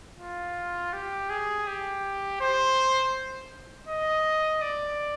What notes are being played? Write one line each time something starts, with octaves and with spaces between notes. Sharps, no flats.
F4
G4
G#4
G4
C5
D#5
D5